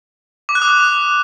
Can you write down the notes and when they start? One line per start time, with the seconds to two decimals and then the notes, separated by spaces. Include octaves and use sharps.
0.49 D6
0.55 F#6
0.62 D#6
0.68 F#6